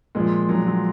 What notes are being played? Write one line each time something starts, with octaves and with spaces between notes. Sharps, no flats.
A#2 F3 G#3
A#2 F3 F#3
F#3